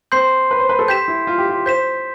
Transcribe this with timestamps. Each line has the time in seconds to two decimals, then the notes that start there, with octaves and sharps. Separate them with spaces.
0.12 C4 C6 G6 C7
0.51 B4
0.59 C5
0.69 B4
0.79 A4
0.88 G4 G6 B6 E7
1.08 E4
1.27 F4
1.38 G4
1.49 F4
1.66 C5 G6 B6 E7